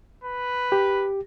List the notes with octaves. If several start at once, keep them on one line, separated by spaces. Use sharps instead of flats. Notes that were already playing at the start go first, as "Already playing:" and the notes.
B4
G4